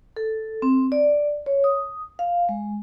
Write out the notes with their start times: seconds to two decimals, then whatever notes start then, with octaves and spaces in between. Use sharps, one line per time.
0.16 A4
0.62 C4
0.92 D5
1.46 C#5
1.64 D#6
2.19 F5
2.49 G#3